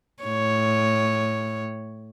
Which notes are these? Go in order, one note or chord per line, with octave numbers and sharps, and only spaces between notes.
A2 C#5